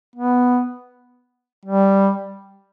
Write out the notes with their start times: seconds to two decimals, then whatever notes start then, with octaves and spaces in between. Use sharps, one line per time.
0.16 B3
1.66 G3